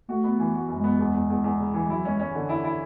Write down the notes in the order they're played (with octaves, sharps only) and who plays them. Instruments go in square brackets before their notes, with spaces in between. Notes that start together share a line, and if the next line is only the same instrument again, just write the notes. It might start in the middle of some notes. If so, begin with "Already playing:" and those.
[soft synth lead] A3 [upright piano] F#4
[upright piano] B3
E3
F#4
F#2
[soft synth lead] G#3
[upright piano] B3
E2
E2
E2
E2
C#3
E3
[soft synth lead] G#3
[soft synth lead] F#3 [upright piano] E4
[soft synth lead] G#3 [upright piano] C#4
[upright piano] C#4
D3
E4
E4